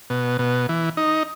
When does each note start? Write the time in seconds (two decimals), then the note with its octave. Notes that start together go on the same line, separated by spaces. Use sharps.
0.10 B2
0.39 B2
0.69 E3
0.97 D#4